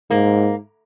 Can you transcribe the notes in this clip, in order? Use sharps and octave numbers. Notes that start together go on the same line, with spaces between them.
G#2 A#3